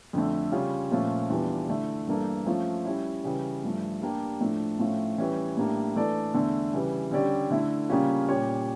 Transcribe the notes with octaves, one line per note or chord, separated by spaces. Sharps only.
F2 D3 A3
C#3 G3 C#4 F4
A#2 F3 A3 C#4 F4
E2 E3 G3 D4 F4
D3 A3 E4
G2 E3 A#3 D4 A4
F3 A3 C#4 F4
G3 C#4 E4
C#3 E3 G3
G2 F3 A3
G3 A#3 D4 G4
A2 F3 A3 D4
A2 F3 A3 C#4 F4
E3 G3 C#4
A2 G3 A#3 D4
E3 A3 D4 A4 D5
E2 D3 A3
C#3 E3 G3
D3 G3 C#4 G4 D5
D3 A3 E4
C#3 G3 A#3 C#4 F4
A#2 G3 C#4 G4 C#5